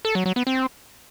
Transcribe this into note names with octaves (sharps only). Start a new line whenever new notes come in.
A4
F#3
F#3
B3
C4